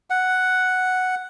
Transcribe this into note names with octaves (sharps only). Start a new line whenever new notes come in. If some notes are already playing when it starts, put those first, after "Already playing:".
F#5